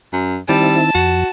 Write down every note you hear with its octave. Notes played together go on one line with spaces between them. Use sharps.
F#2
D#3 G3 C4 E4 A5
F2 F#4